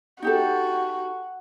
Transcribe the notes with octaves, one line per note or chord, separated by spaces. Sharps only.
D#4 F#4 G4 A4